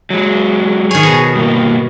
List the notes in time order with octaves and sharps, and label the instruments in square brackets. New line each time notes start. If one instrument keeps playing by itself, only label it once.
[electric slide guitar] F#3 G#3
[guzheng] D#3 C#5 [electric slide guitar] G#4
[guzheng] B2
[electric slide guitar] G2 A#3